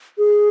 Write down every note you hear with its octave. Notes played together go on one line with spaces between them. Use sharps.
G#4